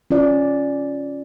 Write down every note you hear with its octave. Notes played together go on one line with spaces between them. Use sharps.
C#4 F4 D5